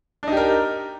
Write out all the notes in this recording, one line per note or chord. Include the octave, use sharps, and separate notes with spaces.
D4 D#4 G4 A#4